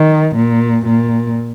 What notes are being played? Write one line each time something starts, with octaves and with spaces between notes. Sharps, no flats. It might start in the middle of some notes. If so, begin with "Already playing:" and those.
Already playing: D#3
A#2
A#2